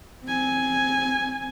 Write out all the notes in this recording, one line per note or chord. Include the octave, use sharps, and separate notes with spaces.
C4 G#5